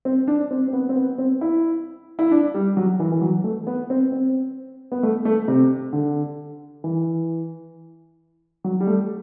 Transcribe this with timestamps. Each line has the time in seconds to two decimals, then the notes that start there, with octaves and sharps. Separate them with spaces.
0.05 C4
0.28 D4
0.51 C4
0.68 C4
0.73 B3
0.89 C4
0.96 B3
1.18 C4
1.41 E4
2.19 E4
2.31 D4
2.54 G3
2.77 F#3
3.00 E3
3.12 E3
3.22 F#3
3.44 A3
3.67 B3
3.90 C4
4.12 C4
4.92 B3
5.03 A3
5.25 A3
5.48 C3
5.93 D3
6.84 E3
8.64 F#3
8.81 G3
8.87 A3